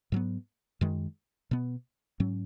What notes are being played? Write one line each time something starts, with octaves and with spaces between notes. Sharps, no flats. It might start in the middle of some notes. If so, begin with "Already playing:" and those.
G#2 F#3 B3
F#2 D#3 G#3
B2 B3
G#2 F#3 C#4